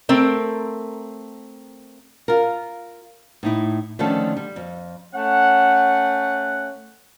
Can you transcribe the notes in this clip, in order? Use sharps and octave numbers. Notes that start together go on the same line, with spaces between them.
A3 C4 A#4
F4 A#4
A2 D#4 E4
D3 D#3 F3 A3 C#4 A4
G3
F2
A3 C#4 F#5